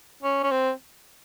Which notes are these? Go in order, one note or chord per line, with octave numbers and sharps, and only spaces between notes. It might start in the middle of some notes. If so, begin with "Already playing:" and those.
C#4
C#4
C4